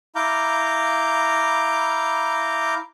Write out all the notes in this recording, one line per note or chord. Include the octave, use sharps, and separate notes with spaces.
E4 F5 A#5 D6 G6